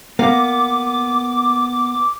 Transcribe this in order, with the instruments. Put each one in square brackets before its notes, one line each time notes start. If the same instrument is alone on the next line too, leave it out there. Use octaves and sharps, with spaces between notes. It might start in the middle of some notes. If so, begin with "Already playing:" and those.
[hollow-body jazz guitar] A#3 B3 [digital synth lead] D6